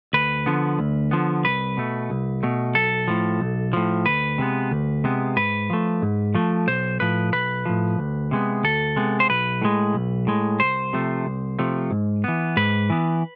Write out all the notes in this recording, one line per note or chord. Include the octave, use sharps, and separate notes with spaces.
D2 B4
D3 F3 B3
D2
D3 F3 B3
C2 B4
B2 A3
C2
B2 A3
B1 A4
A2 F3
B1
A2 F3
D2 B4
C3 G#3 B3
D2
C3 G#3 B3
G#2 B4
F3 A3
G#2
F3 A3
B1 C5
A2 F3 B4
B1 B4
A2 F3
D2
C3 G#3 B3
D2 A4
C3 G#3 B3
C5
B1 B4
A2 G#3
B1
A2 G#3
C2 C5
C3 F3 A3
C2
C3 F3 A3
G#2
E3 B3
G#2 B4
E3 B3